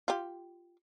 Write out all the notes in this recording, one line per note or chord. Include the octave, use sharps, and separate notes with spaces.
F4 G4